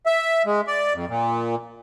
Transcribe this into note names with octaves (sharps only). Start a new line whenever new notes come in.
E5
G#3
D5
F2
A#2